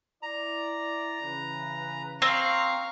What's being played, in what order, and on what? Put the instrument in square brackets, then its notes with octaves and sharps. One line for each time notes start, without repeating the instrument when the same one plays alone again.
[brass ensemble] E4 D5 [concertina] A#5
[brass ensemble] C#3 E3 B4
[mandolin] C4 [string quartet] F5 A#5 C#6